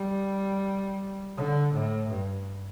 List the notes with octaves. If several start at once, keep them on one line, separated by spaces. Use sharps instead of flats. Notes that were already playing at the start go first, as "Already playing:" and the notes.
Already playing: G3
D3
A2
G2